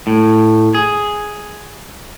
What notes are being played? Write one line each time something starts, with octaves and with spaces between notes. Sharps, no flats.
A2
G#4